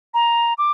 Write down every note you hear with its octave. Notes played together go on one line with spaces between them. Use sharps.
A#5
D6